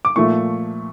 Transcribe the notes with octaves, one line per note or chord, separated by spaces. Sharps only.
D6
A#2 F3 A3 C#6